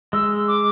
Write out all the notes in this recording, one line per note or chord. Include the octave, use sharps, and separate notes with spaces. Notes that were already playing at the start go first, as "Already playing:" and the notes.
G#3 E6
D6